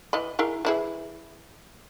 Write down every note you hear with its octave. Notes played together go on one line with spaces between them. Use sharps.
E3 D#5 B5
E4 G#4 A#4
E3 E4 G#4